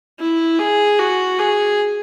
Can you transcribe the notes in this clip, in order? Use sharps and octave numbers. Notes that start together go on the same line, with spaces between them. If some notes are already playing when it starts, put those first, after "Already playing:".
E4
G#4
F#4
G#4